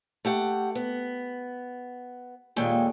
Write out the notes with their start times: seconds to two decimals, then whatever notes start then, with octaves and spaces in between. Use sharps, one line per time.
0.25 A3 G4 F#5
0.75 B3
2.56 D#2 A#2 G#3 A4 G5 G#5